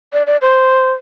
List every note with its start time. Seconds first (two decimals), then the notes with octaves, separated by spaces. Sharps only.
0.13 D5
0.27 D5
0.42 C5